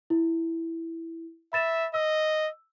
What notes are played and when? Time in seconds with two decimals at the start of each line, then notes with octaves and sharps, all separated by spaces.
0.10 E4
1.53 E5 B5 A6 E7
1.94 D#5 E6